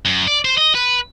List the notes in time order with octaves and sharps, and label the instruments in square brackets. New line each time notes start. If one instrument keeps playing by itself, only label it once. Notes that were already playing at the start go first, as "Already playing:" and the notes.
[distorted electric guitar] F#2
D5
C5
D#5
B4